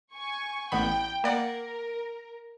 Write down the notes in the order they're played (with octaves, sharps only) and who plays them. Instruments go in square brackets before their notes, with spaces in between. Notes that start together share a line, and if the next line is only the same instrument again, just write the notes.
[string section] G#5 C#6
[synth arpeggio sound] A1 B3 B5 [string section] G5
[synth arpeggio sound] A#3 D5 F#5 [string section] A#4